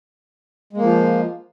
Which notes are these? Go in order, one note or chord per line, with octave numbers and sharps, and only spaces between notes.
F3 G#3 A#3